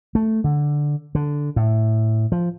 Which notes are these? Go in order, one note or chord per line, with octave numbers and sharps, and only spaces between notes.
A3
D3
D3
A2
F3